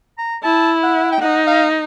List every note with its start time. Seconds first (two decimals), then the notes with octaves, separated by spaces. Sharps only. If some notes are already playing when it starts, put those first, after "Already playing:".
0.18 A#5
0.43 E4 A5
0.83 F#5
1.12 G5
1.21 D#4 F#5
1.47 F5